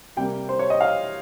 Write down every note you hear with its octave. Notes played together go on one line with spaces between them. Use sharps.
C3 G3 A#3 G5
C5
C#5
D#5
F5